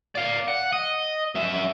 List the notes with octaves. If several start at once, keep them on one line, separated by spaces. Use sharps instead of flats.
D5 F5
F#5
D#5
F#2 E5